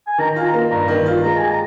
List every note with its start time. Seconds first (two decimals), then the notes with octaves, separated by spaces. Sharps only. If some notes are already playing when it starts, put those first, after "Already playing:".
0.07 G#5
0.18 D#3 A#5
0.36 F4 G#5
0.45 A#5
0.54 A#3
0.70 G2 A#5
0.88 D#3
1.06 F4
1.23 G#3 A#5
1.37 G4 G#5
1.51 A#5